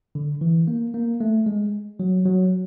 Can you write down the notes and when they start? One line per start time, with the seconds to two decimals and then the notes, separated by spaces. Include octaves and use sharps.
0.15 D3
0.41 E3
0.68 A#3
0.94 A#3
1.20 A3
1.46 G#3
2.00 F#3
2.25 F#3